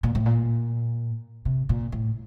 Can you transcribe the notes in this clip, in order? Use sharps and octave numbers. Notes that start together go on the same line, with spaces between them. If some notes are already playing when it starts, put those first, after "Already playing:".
A#2
A2
A#2
C3
A#2
A2